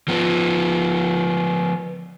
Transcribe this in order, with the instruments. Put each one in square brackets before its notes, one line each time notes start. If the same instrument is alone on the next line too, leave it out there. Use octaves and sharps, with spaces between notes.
[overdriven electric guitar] F3 B3